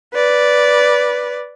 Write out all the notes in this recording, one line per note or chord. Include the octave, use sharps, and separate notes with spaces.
B4 D5